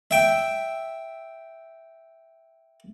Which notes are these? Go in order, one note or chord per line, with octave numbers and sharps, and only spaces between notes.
E5 G5